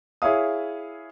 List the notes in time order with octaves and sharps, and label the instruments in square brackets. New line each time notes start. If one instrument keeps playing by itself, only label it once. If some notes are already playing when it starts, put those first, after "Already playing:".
[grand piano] E4 G#4 C#5 E5 F5 D#6